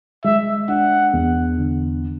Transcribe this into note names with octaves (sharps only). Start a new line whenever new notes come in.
G#3 E5
D4 F#5
E2
D3